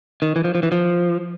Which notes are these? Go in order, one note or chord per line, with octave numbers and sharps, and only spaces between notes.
D#3
E3
F3
F3
E3
F3